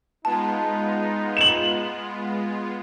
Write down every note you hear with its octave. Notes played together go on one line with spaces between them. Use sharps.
G#3 B3 D#4 F4 A5
E7 F#7